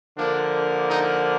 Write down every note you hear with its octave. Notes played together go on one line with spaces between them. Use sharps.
D3 F3 A#3 D4
D#4